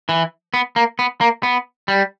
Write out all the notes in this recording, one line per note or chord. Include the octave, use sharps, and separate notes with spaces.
E3
B3
A#3
B3
A#3
B3
G3